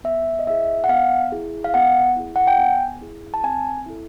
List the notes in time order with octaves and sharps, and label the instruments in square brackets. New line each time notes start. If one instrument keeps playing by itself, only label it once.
[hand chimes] B3 E5
D#5
E4 G#4 E5
F#5
B3 F5
E4 G#4
F5
B3 F#5
E4 G#4
F#5
G5
B3 G#5
E4 G#4
A5
C4 G#5
E4 A4